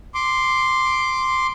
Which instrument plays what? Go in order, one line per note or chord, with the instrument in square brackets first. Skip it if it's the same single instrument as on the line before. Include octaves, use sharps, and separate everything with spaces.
[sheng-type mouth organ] C6 D6